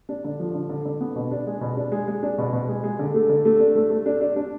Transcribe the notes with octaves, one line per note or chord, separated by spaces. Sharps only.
D4
D3
F3
D3
D3
D3
B3
B2
D4
G#3
B2
D4
G#3
G#3
D4
B2
B2
G#3
G#3
D3
A3
D3
A3
D4
A3
A3
D4
D4
D4